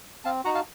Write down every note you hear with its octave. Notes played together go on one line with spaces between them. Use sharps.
C4 F5 A5
D#4 F#4 F#5 A#5
F5 A5